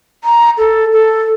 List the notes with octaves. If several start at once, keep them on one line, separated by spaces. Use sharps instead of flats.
A#5
A4
A4